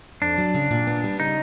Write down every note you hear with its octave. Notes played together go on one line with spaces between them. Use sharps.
F2 D4
F#3
C#3
A#2
B3
G3
C#3 D#4